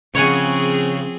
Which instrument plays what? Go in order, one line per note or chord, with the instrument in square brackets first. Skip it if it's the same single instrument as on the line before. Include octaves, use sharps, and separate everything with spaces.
[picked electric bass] C#3 [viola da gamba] F3 C4 G#4 [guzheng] C#5 F#5 G#5